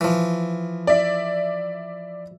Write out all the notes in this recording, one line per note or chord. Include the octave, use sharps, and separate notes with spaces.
E3 F3
D5 E5